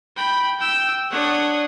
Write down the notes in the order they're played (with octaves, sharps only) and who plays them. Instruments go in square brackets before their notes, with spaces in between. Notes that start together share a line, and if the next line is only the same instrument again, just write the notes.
[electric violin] G5 B5
G5 E6
[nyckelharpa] D4 F#5 [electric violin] C#5 D#6